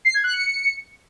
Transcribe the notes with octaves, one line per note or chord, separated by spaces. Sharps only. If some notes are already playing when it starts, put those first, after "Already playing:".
C7
G#6
F#6
C#7